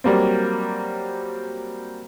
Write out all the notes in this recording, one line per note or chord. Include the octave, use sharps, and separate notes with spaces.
F#3 G3 A#3 C4